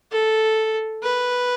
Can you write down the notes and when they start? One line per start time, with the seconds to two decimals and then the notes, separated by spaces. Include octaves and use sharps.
0.12 A4
1.03 B4